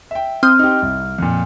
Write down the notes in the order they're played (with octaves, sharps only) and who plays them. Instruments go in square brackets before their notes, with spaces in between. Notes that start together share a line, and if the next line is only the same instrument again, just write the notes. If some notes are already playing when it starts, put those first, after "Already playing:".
[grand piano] E5 G5
[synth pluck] C4 C6 D#6 [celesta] F6
[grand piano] D#4 G4
C2
F2 A#2